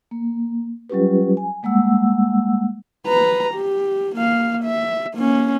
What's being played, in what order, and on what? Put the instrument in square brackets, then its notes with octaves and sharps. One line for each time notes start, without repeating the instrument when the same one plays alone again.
[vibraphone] A#3
F#3 G3 C#4 F4 G4 B4
G#5
G3 G#3 A#3 F#5 E6
[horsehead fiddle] B4 A#5
G4
A#3 F5
E5
A#3 C#4